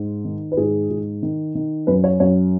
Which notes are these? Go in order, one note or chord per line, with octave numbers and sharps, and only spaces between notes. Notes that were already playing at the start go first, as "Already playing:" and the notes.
Already playing: G#2
D#3
B4
G#2 G#4
G#2
D#3
D#3
F#2 B4
C#5
F#2 C#5